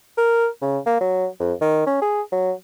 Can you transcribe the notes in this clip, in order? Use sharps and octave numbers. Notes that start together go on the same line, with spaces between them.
A#4
C#3
A#3
F#3
F2
D#3
C#4
G#4
F#3